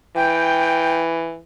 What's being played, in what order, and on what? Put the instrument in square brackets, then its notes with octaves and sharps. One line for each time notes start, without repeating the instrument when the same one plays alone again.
[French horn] E3 [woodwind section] G5